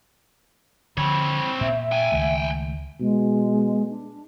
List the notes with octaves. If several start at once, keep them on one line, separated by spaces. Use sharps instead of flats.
D3 F3 C4 C#5 B5
A#2 E5
G5 G#5
C#2 D#3 A3
B2 G#3
D4